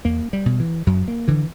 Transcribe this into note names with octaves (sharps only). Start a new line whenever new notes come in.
E2 A#3
G3
B2
E3
F#2 F#3
A#3
D3 E3